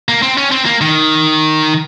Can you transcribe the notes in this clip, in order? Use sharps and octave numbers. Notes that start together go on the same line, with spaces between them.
A#3
C4
C#4
C4
A#3
D#3